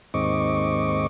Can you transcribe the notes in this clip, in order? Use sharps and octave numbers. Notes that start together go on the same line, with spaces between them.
D#2 G#2 C4 D#5 C#6 D6